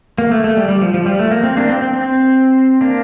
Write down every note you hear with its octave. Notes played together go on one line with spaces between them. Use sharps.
A#3
A3
A3
G3
G3
F3
F3
G3
A3
A#3
C4
A#3 D4
C4
C4
C4
A#3 D4